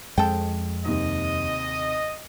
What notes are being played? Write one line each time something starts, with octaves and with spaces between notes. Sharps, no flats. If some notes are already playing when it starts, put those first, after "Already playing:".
F2 G#3 A4 G5
D#2 C3 D#5